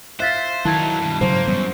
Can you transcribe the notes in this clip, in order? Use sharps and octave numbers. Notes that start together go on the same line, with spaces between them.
C5 E5 F5 F#6 A6 B6
D#3 F#3 D#4 E4 A5 G#6
G2 B2
G#2 C#3 F#3 A#3 C5
F#2 E3 G3 B3